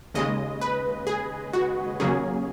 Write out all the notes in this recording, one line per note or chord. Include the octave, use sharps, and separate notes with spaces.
D#2 C#3 G#3 D#5
B4
G#4
F#4
D#2 C#3 F#3 A#3 C#4 G#4